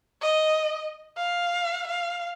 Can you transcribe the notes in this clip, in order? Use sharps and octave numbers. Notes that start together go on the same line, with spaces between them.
D#5
F5
F5